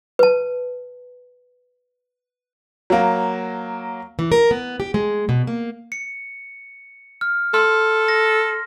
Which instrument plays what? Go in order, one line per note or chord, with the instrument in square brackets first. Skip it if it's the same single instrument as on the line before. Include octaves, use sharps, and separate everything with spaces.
[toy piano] B4 A5
[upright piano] F#3 A#3
[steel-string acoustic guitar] E3
A#4
B3
G4
G#3
B2
A#3
[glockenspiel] C#7
F6
[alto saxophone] A4 [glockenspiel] C6 F6
[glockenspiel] A#6